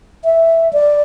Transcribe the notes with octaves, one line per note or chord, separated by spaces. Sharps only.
E5
D5